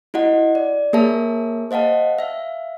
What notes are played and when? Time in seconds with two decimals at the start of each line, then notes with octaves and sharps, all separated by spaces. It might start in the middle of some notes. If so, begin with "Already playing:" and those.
0.14 E4 F#4 D#5 F#5
0.55 D5
0.93 A#3 G#4 A#4 C#5 E5 A5
1.71 C5 D#5 F5 F#5 A5
2.19 E5 F5